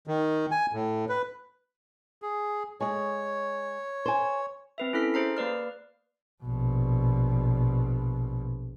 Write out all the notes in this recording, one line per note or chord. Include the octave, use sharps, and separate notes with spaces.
D#3
G#5
A2
B4
G#4
G#3 G#4 C#5
C5 G#5
C4 B4 E5
C#4 E4 A4 F6 B6
G#4 C5 A#5 C7
A#3 B4 D5 F6
A#1 B2